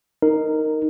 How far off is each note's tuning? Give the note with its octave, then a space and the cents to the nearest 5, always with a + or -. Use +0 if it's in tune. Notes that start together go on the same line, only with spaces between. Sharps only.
D#4 +0 A#4 -10